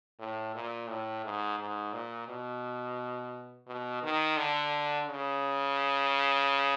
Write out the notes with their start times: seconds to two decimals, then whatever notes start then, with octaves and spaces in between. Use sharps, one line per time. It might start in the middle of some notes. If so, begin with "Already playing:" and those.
0.20 A2
0.55 A#2
0.89 A2
1.24 G#2
1.59 G#2
1.93 A#2
2.28 B2
3.67 B2
4.03 D#3
4.37 D3
5.07 C#3